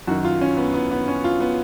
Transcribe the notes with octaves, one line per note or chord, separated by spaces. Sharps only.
F#2 D#3 F#4
F4
C#4
B3
B3
B3
C#4
F4
B3